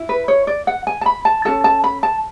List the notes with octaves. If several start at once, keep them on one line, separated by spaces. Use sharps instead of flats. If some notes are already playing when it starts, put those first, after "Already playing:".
Already playing: E4
B4
C#5
D5
F#5
G#5
A5
B5
A5
C#4 F#4 A4 A5
A5
B5
A5